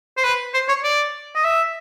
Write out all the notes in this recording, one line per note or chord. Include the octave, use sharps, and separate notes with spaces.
C5
B4
C5
C#5
D5
D#5
E5